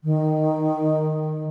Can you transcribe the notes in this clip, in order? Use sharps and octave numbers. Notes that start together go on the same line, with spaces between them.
D#3